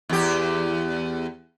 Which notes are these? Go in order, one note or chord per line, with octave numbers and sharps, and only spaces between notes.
E2 G4